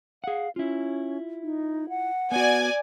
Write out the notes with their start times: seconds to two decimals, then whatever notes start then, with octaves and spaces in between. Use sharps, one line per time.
0.24 G#4 F5 F#5
0.56 C#4 E4 F4
1.43 D#4
1.89 F#5
2.32 B3 F#4 D5 G#5